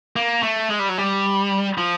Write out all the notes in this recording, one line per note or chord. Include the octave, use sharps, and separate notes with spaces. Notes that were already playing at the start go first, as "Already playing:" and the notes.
A#3
A3
G#3
G3
F#3
G3
F3